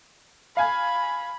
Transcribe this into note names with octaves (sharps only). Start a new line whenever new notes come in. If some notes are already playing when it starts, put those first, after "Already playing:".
F5 G#5 B5 G#6